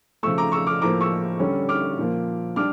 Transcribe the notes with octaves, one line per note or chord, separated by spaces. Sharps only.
C#3 F3 A3 C#6 E6
A#5 D6
C#6 E6
D6 F6
A2 F3 A#3 A#5 D6
C#6 E6
D3 G3 C#4
D6 F6
A#2 F3 A#3
G3 D4 D6 F6